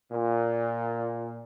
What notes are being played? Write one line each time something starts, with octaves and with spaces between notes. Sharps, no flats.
A#2